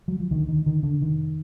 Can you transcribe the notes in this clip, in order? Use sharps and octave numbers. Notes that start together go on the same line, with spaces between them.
F#3
F3
D2 D#3
D#3
D3 D#3
D3
F1 D#3